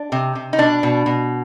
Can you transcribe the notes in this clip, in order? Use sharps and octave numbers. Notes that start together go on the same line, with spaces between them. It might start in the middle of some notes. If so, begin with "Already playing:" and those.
Already playing: D4
C3
C3
D#4
B2 D4
B2
B2